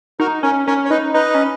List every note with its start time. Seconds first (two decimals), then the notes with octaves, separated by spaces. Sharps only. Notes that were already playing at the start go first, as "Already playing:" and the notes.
0.20 D#4 F#4 A#4
0.43 C#4 A#4 C#5
0.67 C#4 A#4 C#5
0.85 C#5
0.90 D#4 B4 D#5
1.14 D#4 B4 D#5
1.34 C#4